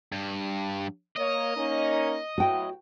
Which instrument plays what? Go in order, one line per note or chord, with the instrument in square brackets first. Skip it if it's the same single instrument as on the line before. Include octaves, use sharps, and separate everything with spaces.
[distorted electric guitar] G2
[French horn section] A#3 C#5 [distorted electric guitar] D#5
[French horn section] A#3 C#4 D#4
[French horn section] A2 F#3 [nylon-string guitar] F#4 G5